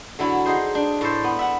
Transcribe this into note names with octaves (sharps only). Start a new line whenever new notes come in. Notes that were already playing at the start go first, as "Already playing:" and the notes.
D3 F#3 E4 C#5
D#4 G#4 C5
D4
A2 A4 C5
B3
E5 F#5